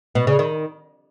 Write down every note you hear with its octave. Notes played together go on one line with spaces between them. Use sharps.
B2
C#3
D#3